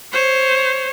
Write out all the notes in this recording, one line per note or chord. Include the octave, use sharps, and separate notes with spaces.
C5 C#5